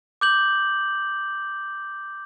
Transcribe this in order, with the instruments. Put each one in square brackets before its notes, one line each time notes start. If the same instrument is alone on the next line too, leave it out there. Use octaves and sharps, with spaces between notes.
[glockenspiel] D6 G6 F#7